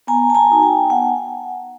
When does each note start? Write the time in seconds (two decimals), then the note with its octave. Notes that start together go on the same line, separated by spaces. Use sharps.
0.07 B3 G#5 A#5
0.30 A5
0.35 G#5 A#5
0.49 D#4 F#4
0.62 G5 A5
0.90 B3 F#5 G#5